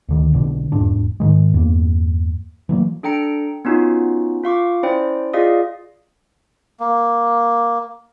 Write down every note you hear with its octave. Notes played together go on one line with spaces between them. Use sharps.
D2 D3 D#3
B1 B2 D3
E1 F2 G#2 D4
G#2 D#3 G#3
E2 G2 A#3
E3 F#3 A#3
D4 A4 G5 A#5 C#7 D7
B3 C#4 D#4 F4 F#4
F4 F5 C#6 D6
C#4 E4 C5 D5 G5
F4 G#4 D5 D#5 F5 D#6
A#3